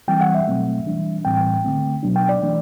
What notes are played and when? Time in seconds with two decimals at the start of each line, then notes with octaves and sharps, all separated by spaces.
0.08 E3 G3 C4 G5
0.21 F#5
0.35 E5
0.47 B2 F#3 A3 C4
0.86 E3 G3 D4
1.25 A2 E3 G3 C4 G5
1.64 D3 A3 C4
2.03 B2 F#3 B3 D4
2.16 G5
2.29 D5
2.42 E3 A3 D4